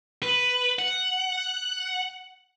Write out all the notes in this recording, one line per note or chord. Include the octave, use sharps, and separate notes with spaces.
B4
F#5